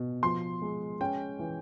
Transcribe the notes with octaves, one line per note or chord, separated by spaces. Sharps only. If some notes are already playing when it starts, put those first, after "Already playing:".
Already playing: B2
F3 C6
G#3
C#4 G5
E3